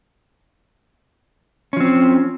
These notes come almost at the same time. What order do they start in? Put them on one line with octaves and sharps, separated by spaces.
C#4 F3 C4